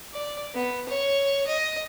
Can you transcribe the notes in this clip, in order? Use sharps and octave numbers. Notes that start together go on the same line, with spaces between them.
D5
B3
C#5
D#5